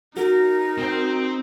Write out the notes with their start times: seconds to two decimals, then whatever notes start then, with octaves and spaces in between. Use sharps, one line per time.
0.17 D#4 F#4 A#4
0.78 C4 G5